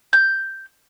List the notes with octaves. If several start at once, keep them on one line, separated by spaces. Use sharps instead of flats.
G6